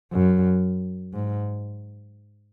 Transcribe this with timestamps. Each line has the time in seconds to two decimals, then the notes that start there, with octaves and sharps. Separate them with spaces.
0.12 F#2
1.13 G#2